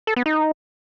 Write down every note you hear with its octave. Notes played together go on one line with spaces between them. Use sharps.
A4
B3
D#4